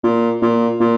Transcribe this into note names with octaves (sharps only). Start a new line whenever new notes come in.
A#2
A#2
A#2